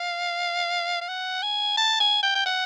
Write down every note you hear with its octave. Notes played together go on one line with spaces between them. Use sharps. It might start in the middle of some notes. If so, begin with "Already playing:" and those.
Already playing: F5
F5
F#5
G#5
A5
G#5
G5
G5
F#5